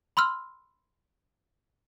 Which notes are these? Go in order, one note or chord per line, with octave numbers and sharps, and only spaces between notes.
B5 C6 E6 F6